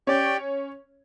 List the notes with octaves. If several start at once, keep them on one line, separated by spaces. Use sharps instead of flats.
C#4 G4 C#5 D5 G5